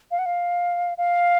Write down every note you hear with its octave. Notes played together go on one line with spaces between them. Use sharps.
F5
F#5
F5
F5